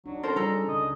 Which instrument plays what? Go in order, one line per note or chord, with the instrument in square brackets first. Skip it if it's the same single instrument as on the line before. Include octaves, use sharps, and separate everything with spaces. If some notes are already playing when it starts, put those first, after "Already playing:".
[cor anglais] F#3 [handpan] D4 D#4
[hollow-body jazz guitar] C4 C#4 C#5 [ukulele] A4 A#4 C5
[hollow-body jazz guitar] G3 [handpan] D4 G#4 [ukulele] F4 A4 A#5
[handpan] C#4
[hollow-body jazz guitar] C#2 D3 [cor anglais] D#5